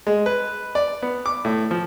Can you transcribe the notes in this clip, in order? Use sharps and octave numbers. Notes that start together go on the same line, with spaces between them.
G#3
B4
D5
B3
D6
A2
F3